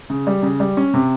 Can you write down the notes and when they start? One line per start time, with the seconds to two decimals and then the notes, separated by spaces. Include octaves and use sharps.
0.10 C#3
0.27 G3
0.43 C#3
0.60 G3
0.77 C#4
0.94 C3